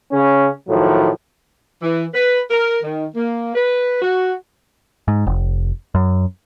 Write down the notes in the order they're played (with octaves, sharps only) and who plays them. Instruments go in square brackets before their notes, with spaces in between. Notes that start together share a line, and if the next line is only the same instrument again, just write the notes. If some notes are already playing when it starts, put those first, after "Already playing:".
[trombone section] C#3 C#4
A2 D#3 F3 F#3
[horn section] E3
B4
A#4
D#3
A#3
B4
F#4
[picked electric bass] G#2
F1
F#2